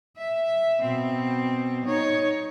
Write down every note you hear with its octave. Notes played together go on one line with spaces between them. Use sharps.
E5
B2 C4
D#4 C#5